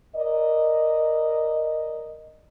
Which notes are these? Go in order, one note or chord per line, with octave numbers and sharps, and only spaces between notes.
A#4 D5 D#5